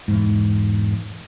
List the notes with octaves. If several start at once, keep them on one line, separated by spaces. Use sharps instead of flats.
E1 G#2